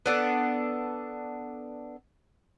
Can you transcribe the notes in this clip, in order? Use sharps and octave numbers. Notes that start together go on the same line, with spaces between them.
B3 D4 A4